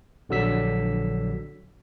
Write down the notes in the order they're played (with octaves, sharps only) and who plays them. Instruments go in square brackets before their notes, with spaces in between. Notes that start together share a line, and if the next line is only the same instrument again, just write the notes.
[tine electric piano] A#1 D3 F#3 E6 B6